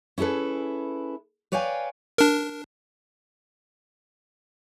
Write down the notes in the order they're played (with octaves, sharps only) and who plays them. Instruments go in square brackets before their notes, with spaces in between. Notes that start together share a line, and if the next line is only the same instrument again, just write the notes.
[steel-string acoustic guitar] C#4 E4 G#4 A4 B4
B4 C#5 D5 F5 G5 G#5
[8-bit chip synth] D4 A#4